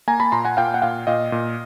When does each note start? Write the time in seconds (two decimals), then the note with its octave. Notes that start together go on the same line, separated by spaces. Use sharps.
0.08 A#3 G#5 A#5
0.20 A5 B5
0.32 A#2 A#5 C6
0.45 F#5 G#5
0.57 A#2 F5 G5
0.74 F#5
0.82 A#2 F5 G5
1.07 A#2 D#5 F5
1.32 A#2